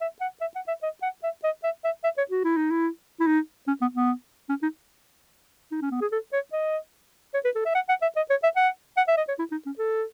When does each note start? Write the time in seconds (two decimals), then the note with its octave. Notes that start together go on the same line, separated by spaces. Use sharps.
0.01 E5
0.21 F#5
0.41 E5
0.55 F#5
0.68 E5
0.82 D#5
1.02 F#5
1.23 E5
1.44 D#5
1.63 E5
1.84 E5
2.04 E5
2.18 C#5
2.31 F#4
2.44 E4
2.57 D#4
2.71 E4
3.20 E4
3.27 D#4
3.67 C#4
3.81 B3
3.95 B3
4.49 C#4
4.62 D#4
5.72 D#4
5.82 C#4
5.91 B3
6.01 G#4
6.12 A4
6.33 C#5
6.52 D#5
7.34 C#5
7.44 B4
7.55 A4
7.65 E5
7.75 F#5
7.89 F#5
8.02 E5
8.16 D#5
8.30 C#5
8.43 E5
8.56 F#5
8.97 F#5
9.08 E5
9.17 D#5
9.28 C#5
9.39 E4
9.51 D#4
9.66 C#4
9.78 A4